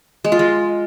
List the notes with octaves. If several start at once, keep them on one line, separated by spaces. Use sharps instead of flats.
G#3
F4
G#3